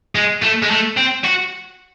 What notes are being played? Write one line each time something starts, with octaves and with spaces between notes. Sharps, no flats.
G#3
A3
G#3
A3
C4
F#4